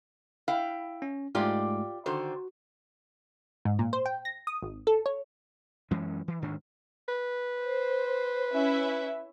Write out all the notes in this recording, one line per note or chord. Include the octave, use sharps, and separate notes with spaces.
E4 F5 G5
C#4
G#2 G#3 A3 F4 G4 D5
D3 D#3 F#4 C5
G#2
A#2
C5
G5
A#6
D#6
G#1
A4
C#5
F#2 E3 G#3 C#4
E3
D2 G#2 D#3 D4
B4
C5
C#4 E4 E5